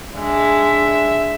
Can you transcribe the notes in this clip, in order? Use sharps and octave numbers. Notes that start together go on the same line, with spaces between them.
G#3 D4 E5